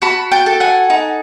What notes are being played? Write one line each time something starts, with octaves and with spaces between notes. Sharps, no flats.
F#4 A5 B5
G5 A5
A4
F#5 G#5
D#4